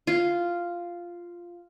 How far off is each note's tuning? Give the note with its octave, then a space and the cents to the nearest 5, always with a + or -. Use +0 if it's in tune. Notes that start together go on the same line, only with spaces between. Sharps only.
F4 -5